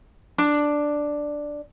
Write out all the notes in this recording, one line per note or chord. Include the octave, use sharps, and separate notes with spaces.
D4